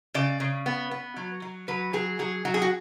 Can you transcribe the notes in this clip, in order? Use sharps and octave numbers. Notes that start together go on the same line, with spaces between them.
C#3 D5
C#3
B3
B3
F#3
F#3
F#3 B4
F#3 G#4
F#3 G#4
F#3 F#4
G#4
F#4